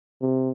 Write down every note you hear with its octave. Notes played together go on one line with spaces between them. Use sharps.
C3